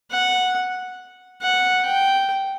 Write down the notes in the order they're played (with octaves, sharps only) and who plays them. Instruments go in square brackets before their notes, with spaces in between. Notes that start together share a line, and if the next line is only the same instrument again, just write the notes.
[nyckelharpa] F#5
F#5
G5